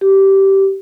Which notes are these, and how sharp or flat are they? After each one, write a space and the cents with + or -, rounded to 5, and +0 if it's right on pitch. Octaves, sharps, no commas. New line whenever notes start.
G4 -15